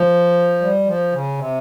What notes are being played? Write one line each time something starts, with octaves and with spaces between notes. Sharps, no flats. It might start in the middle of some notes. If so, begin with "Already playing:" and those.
Already playing: F3
G3
F3
C#3
C3